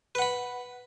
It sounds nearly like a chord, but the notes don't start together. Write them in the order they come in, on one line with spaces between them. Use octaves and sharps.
B4 F#5 B5